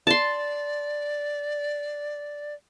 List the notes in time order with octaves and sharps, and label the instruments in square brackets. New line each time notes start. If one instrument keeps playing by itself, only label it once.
[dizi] D5 [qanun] A5 C6